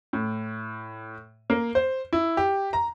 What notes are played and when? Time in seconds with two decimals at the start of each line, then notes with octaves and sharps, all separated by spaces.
0.13 A2
1.50 A#3
1.75 C5
2.13 E4
2.37 G4
2.73 A#5